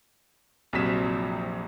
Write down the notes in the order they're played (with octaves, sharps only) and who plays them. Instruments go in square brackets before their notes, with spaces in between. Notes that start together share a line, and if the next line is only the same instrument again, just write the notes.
[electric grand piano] A#1 F2 C3 F#3 B6 E7